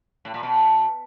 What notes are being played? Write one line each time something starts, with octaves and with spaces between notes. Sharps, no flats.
A2
A#2
B2